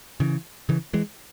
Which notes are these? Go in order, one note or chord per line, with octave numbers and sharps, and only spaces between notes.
C#3 E3
C#3 E3
E3 G#3